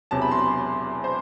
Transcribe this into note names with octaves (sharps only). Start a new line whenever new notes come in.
E1 E2 C3 F#3 A5
B5
C6
B5
C5